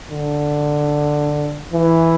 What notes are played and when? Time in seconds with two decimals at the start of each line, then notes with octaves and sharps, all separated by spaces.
0.11 D3
1.73 E3